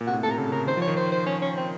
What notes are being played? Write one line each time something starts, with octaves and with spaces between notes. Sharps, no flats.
A#2
C3 F#4
A2
A#2
C3 A4
A#4
C#3 A4
C#3 A#4
D#3 C5
F3 C#5
D#3
C5
C5
C#4
C#4
C4